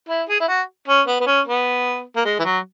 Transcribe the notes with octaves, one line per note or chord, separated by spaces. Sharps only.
E4
G#4
E4
F#4
C#4
B3
B3
C#4
B3
A#3
G#3
E3
F#3